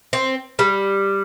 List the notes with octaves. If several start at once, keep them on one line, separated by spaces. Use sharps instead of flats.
C4
G3